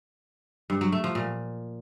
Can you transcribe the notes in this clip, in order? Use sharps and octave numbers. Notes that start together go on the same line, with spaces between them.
G2
F#3
A3
F3
A#2